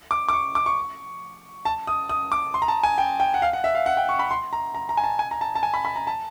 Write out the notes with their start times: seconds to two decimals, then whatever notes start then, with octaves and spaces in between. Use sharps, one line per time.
0.11 D6
0.28 D6
0.33 C#6
0.55 D6
0.66 C#6
1.65 A5
1.87 D#6
2.09 D#6
2.32 D6
2.54 C6
2.62 A#5
2.68 A5
2.83 G#5
2.98 G5
3.20 G5
3.34 F#5
3.42 F5
3.53 F#5
3.64 E5
3.75 F5
3.86 F#5
3.97 G5
4.09 C#6
4.19 B5
4.31 C6
4.53 A#5
4.74 A#5
4.89 A#5
4.97 G#5
5.04 A5
5.19 G#5
5.31 A#5
5.41 A5
5.55 A5
5.63 G#5
5.74 B5
5.85 B5
5.96 A#5
6.07 A5